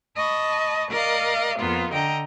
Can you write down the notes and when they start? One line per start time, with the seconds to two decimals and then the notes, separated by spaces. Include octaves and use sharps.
0.16 D#5 A5 B5 C#6
0.91 A#4 D5 D#5 F5
1.58 F2 A#3 B3 F4
1.92 D3 D#5 G5 A#5